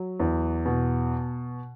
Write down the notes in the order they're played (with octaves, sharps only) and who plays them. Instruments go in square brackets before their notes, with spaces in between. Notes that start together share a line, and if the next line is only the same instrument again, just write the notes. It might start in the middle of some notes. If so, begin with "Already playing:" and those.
Already playing: [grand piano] F#3
E2
B2